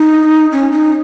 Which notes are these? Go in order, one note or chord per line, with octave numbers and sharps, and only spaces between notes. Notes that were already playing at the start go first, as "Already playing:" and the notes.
Already playing: D#4
C#4
D#4